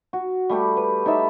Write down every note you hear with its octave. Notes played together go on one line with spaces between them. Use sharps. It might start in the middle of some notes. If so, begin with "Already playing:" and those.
F#4
G3 A3 G4
B4
D#4 E4 D5 E5